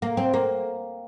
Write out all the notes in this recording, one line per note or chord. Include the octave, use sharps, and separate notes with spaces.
A#3
C4
A#3